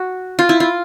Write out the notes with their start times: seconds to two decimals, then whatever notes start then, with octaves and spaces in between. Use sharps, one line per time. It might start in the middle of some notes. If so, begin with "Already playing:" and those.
Already playing: F#4
0.39 F4
0.49 E4
0.60 F4